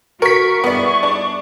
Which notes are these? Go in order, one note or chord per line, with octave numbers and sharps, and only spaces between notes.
F#4 A#4 C#6 B6
G2 B3 E4 G#4 D5
D4